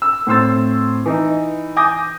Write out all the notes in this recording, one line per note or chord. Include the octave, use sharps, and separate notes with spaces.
E6
A2 C4 C5 C6 E6 A6
E3 D#4
G#5 D6 D#6 G6 A#6